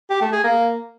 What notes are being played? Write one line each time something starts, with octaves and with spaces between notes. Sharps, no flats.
G4
A3
G#4
A#3